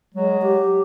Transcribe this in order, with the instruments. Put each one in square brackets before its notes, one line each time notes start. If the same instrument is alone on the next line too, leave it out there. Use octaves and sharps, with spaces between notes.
[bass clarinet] F#3 [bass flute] G#3
[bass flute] G4